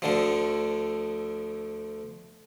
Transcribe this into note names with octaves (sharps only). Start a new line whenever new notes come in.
D2 D3 F3